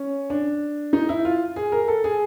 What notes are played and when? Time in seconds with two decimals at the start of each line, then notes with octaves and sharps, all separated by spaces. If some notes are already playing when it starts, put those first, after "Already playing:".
Already playing: C#4
0.30 D4
0.93 D#4
1.09 E4
1.25 F4
1.56 G#4
1.72 A#4
1.88 A4
2.04 G#4